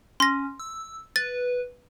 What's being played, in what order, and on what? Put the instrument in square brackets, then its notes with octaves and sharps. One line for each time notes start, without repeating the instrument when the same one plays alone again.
[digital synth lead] C#4 [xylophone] C6 A#6
[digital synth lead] E6
[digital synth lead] B4 [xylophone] A6